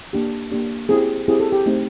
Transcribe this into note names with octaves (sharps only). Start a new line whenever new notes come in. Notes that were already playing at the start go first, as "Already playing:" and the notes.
A#3 D4 G4
A#3 D4 G4
C4 E4 G4 G#4
C4 E4 G4 G#4
A4
G4
A3 C4 D#4